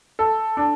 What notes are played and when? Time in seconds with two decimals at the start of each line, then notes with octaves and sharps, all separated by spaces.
0.19 A4
0.57 D4